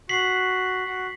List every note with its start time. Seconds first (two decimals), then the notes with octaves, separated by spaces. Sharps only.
0.09 F#4 B6 C7 F#7
0.85 F#4